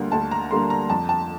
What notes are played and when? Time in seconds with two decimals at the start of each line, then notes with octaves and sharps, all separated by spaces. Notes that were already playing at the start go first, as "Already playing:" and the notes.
Already playing: D2 D3 G3 A#3
0.12 D2 A5
0.31 A#5
0.51 D3 G3 A#3 C6
0.70 A#5
0.90 F2 A5
1.09 A5